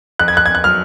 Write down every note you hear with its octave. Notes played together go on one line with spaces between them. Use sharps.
F2 F#6
G#6
F#6
G#6
F#6
F#3 F6